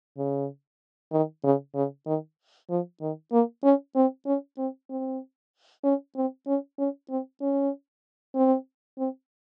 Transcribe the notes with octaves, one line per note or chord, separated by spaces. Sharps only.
C#3
D#3
C#3
C#3
D#3
F3
D#3
A#3
C#4
C4
C#4
C4
C4
C#4
C4
C#4
C#4
C4
C#4
C4
C4